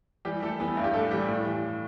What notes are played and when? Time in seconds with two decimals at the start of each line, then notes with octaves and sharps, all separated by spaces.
0.25 E3 G3 G4
0.42 E3 A3 A4
0.60 E3 B3 B4
0.77 G2
0.84 G4
0.94 A2 A3 A4
1.11 E3 G3 G4
1.28 A2
1.46 E3